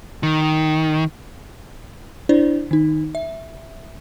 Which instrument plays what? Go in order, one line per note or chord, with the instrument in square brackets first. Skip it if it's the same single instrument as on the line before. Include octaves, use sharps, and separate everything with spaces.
[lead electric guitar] D#3
[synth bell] D4 E4 C5 D5
D#3 D#4
E5